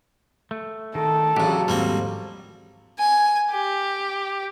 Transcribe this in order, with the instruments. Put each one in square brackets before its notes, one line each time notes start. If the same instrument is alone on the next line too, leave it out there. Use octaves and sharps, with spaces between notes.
[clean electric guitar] A3
[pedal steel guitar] D#3 [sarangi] A4
[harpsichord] A1 C#3 [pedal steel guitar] F#3 [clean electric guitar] D4 G4
[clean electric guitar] D#2 G#2 F3 [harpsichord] G3 A#3 C4
[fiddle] G#5
G4